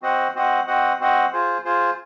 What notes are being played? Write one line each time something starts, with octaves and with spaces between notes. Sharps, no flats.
C4 F#4 C5 D#5 F#5
C4 F#4 C5 D#5 F#5
C4 F#4 C5 D#5 F#5
C4 F#4 C5 D#5 F#5
F4 G#4 C5
F4 G#4 C5